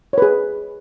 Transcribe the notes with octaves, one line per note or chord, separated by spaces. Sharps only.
G#4 B4 C#5